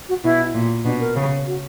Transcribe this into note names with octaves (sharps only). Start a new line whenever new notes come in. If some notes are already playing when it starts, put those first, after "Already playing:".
F#4
B2 E4
A#2
B2 D4
A#4
C#3
F#4